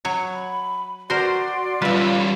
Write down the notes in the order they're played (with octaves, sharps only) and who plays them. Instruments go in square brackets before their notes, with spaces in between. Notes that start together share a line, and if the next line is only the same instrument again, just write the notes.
[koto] F#3 C#5
[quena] B5
[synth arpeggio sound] F#4 C6 [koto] A#4 C5 [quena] D5
[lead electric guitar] G3 C#4 [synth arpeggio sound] F4 [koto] B4 E5